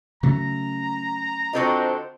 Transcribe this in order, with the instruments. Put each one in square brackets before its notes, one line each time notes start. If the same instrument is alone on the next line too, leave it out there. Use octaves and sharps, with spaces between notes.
[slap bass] C#3 F#3 A3 [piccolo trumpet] A#5
[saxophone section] D3 F3 C4 [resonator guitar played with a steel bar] F#4 A4 D#5